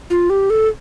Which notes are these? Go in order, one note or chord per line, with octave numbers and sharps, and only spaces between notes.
F4
G4
A4